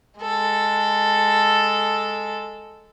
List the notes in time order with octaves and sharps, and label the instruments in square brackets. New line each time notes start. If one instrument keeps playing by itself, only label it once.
[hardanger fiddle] G#3 A4